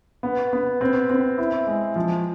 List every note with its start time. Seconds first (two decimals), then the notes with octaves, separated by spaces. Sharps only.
0.23 B3
0.53 B3
0.81 C4
1.10 C4
1.38 E4
1.67 G#3
1.96 F3